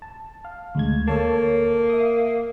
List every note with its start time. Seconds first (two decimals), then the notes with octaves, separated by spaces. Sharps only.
0.02 A5
0.45 F5
0.75 D2 G#3 G#6
1.08 A#3 A4 C#5 A5
1.90 E5 D#6